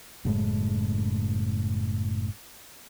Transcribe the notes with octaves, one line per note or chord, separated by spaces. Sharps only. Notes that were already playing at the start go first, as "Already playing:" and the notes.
F#1 A2 G#3